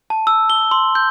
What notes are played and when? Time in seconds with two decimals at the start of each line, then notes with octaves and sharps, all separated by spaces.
0.10 A5
0.27 E6
0.50 G7
0.71 C6
0.95 G6